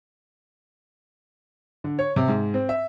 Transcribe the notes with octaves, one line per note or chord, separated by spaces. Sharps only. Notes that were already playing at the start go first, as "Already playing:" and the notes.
D3
C#5
C3
G#2
C4
E5